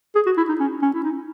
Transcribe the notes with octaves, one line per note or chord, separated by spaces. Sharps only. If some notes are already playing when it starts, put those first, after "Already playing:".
G#4
F#4
E4
D#4
C#4
C#4
E4
D#4